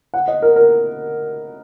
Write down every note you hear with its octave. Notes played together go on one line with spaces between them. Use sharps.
F#5
D#5
A#4
A#4